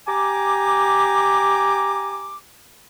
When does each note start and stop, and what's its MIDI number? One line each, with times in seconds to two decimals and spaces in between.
0.07 2.37 67
0.07 2.37 80
0.07 2.37 82
0.07 2.37 86